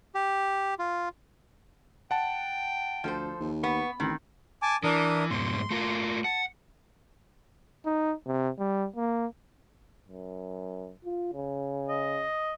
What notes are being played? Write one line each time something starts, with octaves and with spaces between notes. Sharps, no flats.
G4
F4
F#5 G5 A5
D2 F3 A4 C5
D#2
B3 B5 C#6
A1 D#3 C4
G#5 A5 D6
E3 D4 A#4 D#6
F2 G#2 B2 C6
A3 F4 A#4
F#5 A5
D#4
C3
G3
A#3
F#2
F4
C#3
D#5